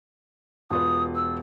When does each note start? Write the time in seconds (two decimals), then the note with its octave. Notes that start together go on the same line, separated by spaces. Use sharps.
0.70 E1 F4 B4 D#6
1.15 E6